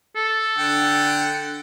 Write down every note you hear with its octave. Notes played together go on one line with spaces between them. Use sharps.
A4
D3 F#5 G5